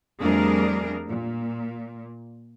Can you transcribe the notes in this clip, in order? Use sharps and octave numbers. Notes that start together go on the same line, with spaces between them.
F2 G3 A3 D4 G#4 A#4
A#2